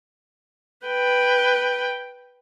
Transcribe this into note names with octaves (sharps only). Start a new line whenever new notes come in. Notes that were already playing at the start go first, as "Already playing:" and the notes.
B4 G5